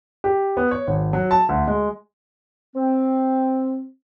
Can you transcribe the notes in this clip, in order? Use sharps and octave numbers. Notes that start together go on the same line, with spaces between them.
G4
B3
C#5
G#1
F#3
A5
D2
G#3
C4